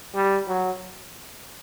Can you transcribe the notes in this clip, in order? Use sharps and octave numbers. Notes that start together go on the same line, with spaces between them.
G3
F#3